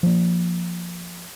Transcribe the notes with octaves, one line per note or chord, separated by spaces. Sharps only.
F3 A#3